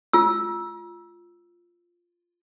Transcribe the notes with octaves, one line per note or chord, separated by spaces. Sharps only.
F4 E6